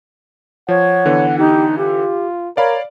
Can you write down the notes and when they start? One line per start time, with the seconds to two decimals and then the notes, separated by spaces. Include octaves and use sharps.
0.69 F3 C#5 F#5
1.06 D3 E3 B3
1.38 D#4 G4
1.78 F4 G4
2.57 A#4 C#5 D5 F5 B5